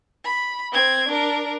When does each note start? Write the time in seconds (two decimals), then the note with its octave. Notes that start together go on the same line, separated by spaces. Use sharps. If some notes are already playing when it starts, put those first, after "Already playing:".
0.24 B5
0.72 C4 G#6
1.08 D4 A#4